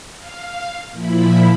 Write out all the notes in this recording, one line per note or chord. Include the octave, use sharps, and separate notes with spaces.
F5
A#2 F3 E4 B5